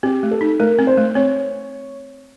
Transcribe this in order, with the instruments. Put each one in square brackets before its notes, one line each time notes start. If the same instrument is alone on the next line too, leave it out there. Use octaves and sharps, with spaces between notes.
[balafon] C4 [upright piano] G4
[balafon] A3
[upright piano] A4
[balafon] D#4
[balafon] A3 [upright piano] A#4
[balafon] C4
[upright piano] C5
[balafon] A3
[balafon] C4 [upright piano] C#5